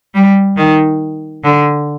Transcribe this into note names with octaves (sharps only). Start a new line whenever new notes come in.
G3
D#3
D3